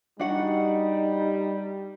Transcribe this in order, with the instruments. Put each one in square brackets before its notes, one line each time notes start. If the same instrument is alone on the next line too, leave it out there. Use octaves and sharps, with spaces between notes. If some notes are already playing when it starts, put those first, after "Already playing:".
[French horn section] G3 [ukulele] D4 F#4 F#5 [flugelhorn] D#4